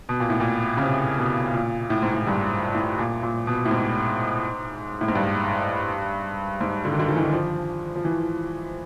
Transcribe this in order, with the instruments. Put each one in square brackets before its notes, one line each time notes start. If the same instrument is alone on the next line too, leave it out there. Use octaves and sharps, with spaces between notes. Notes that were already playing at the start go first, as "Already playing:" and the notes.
[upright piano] B2
A#2
A2
A#2
C#3
C3
B2
A#2
A2
G#2
A2
G2
A2
A#2
A#2
B2
A2
G#2
A2
G#2
G2
G#2
D3
D#3
D3
D#3
E3
D#3
F3
F3
E3